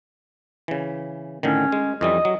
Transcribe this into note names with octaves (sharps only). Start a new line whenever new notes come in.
C#3 E3
A2 D3 D#3 C#4
G#3
F2 E3 G3 D#5
F#3